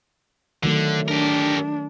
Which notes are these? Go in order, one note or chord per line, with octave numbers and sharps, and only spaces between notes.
D3 D#3 F#3 A3
D4 G4 A#4